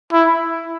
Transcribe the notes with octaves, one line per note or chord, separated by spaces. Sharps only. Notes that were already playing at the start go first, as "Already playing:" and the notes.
E4